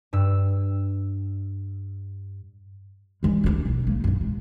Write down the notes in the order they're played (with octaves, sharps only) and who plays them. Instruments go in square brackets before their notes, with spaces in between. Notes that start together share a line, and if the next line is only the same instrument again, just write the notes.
[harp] G2 E6
[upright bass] E3 G#3
D2 D4
B1
A#3 D#4
F#2 A#2
C#2